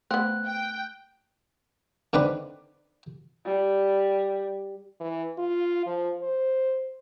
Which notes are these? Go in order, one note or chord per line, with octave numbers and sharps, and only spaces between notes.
A3 B3 C4 F#6
G5
D3 D#3 C4 B4 B5 D6
G3
E3
F4
F3
C5